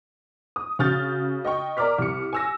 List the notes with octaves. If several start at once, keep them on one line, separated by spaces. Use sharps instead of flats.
D#6
C#3 F#4 F6 G6 A6
D#5 G5 C#6
A#4 D5 A#5 D6 F6 B6
C2 C#7
G#5 E6 A#6